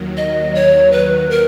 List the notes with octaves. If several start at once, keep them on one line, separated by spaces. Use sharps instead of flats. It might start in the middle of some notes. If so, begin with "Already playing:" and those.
Already playing: D#2 D#3 F#3
D#5
C#5
B4
A#4